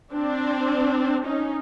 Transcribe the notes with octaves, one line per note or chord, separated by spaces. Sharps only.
C4 D4
C#4 D#4